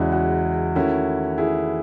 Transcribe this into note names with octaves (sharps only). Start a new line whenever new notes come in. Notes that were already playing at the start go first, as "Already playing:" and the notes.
Already playing: E2 C#3 G#3 C#4 E4 F#4
F#4
D#3 A3 C#4 E4 F#4
E4 G#4